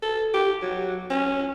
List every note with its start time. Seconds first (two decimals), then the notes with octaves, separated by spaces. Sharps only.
0.02 A4
0.34 G4
0.62 F#3
1.10 C#4